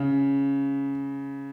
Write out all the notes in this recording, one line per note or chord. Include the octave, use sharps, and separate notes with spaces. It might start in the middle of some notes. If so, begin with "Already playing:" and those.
Already playing: C#3